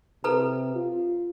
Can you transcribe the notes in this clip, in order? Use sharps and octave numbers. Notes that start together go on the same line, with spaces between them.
C3 A4 B4 A#5
F4